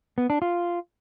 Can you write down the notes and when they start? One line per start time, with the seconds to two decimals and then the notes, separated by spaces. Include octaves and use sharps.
0.18 B3
0.30 D4
0.42 F4